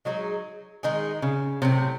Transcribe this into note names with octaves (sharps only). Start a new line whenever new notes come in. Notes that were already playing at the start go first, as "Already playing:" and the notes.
F#3 G#3 D#4 G#4
D#3 G#3 D#4 G#4
C#3
A2 C3 F#3 C#4